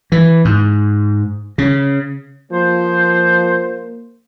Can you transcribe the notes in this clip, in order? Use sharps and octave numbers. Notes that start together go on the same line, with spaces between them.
E3
G#2
C#3
F3 A#3 C5